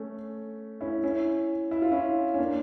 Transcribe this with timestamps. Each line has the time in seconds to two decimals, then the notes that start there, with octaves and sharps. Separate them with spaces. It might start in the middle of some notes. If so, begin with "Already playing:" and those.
Already playing: A3 C#4
0.81 C#4 E4
1.04 C#4 E4
1.71 E4
1.82 F4
1.91 C#4 E4
2.34 C#4
2.38 A#3 D4